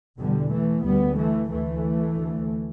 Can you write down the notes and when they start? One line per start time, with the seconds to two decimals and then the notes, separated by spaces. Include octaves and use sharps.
0.18 E2 B2 D3 G3
0.51 E3 A3
0.84 D2 G3 B3
1.17 E3 A3
1.50 D2 E3 A3
2.16 D2